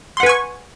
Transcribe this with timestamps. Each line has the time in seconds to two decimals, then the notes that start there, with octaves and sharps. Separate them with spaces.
0.17 C6
0.20 F#5
0.23 B4
0.26 G#5
0.29 C#6